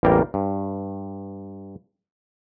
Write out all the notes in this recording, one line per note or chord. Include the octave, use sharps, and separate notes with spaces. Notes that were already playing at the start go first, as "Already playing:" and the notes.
A1 E2 G3 A#3 A#4 G5
G2